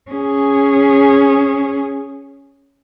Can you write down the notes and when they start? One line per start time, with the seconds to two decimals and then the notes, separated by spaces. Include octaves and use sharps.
0.11 C#4 G#4